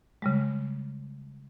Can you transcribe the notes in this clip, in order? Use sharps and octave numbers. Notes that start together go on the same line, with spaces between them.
C#3 G3 G#3